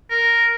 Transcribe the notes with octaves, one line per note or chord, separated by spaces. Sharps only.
A#4